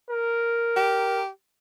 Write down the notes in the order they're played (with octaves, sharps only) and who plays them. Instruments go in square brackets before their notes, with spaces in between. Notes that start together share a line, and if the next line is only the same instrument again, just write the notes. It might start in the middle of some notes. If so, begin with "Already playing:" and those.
[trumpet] A#4
[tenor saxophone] G4